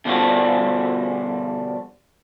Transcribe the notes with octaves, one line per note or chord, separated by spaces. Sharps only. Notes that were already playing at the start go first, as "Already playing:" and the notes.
B2 D3 F3 G3 D4 F#4